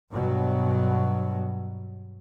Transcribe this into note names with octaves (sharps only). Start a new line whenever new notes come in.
G2 B2 F#3